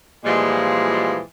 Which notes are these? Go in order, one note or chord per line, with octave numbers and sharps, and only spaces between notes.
A#2 E3 F3 G3 G#3